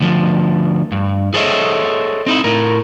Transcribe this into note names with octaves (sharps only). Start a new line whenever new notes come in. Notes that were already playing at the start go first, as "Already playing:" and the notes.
D2 F3
G2
G#4 A4 C5 C#5 D#5 E5
C4 D#4 E4
A2 A#4